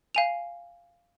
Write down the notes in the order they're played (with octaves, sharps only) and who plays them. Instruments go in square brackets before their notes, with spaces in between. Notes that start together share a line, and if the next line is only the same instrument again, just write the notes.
[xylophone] F5 G#5 F7